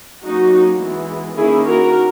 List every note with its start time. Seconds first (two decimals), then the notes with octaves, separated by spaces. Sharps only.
0.25 F#3 A#3 C#4 D#4 F#4
0.81 E3 G#3 B3
1.37 D#3 A#3 C#4 E4 G#4
1.66 F#4 A#4